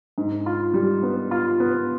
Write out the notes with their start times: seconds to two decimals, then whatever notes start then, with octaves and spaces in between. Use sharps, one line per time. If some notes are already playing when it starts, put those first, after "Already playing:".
0.18 G#2
0.46 F4
0.74 G3
1.03 B3
1.31 F4
1.60 B3